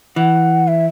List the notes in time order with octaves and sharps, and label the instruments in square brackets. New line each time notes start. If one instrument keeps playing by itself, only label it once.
[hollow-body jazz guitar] E3 [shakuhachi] F#5
[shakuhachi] E5